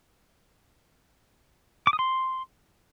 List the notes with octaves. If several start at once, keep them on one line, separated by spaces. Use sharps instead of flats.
D6
D#6
C6